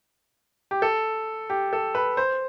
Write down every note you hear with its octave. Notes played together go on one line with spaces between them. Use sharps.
G4
A4
G4
A4
B4
C5